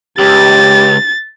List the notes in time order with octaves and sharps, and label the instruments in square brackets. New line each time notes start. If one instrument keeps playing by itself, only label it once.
[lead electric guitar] C#2 [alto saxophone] G4 [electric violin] A6